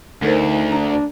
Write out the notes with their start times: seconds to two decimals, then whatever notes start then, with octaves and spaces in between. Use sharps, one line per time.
0.23 D2 D#4 A4 A#4 C5
0.72 D4 A#5